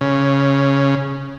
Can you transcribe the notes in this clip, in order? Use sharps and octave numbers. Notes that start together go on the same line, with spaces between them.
C#3